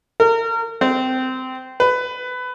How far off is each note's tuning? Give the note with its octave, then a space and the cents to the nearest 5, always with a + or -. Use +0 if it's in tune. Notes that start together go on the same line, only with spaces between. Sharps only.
A#4 -30
C4 -15
B4 +20